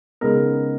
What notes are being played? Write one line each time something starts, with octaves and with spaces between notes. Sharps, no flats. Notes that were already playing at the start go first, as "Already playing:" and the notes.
C#3 G#3 B3 D#4 A#4